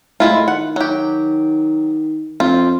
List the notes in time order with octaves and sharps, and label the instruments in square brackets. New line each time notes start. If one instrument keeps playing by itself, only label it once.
[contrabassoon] A2 [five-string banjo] G#3 E4 F4
[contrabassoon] D#3 [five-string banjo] F#5
[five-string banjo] F#3 G4
[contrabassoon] F2 [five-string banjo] C4 F4